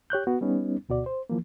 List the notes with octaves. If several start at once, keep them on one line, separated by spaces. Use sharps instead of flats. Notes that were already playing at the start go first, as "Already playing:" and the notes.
G4 C#5 F#6 G6
B3 F#4
G3 B3 C#4 D#4
D2 B2 F#4 D5
C5
E3 F3 A#3